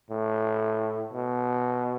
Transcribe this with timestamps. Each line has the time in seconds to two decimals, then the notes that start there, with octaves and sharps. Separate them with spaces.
0.11 A2
1.13 B2